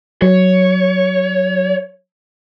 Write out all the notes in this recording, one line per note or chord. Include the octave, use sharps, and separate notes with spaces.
F#3 C#5